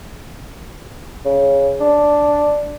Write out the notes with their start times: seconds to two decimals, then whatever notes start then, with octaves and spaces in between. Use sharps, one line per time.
1.25 C#3
1.80 D4